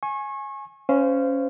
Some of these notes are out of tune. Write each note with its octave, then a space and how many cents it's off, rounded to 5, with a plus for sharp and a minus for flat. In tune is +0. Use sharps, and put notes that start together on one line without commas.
G#5 +10 C#6 -30
C#4 +0 C5 -25 F5 -15